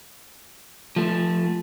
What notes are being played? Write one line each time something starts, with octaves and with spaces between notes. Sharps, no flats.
F3 A3